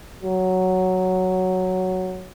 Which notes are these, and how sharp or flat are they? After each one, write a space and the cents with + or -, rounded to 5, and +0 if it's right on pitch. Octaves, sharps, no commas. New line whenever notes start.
F#3 +5